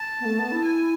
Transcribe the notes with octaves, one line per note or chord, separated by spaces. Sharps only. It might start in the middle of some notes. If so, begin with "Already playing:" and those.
Already playing: A5
B3
A3
B3
E4
G#5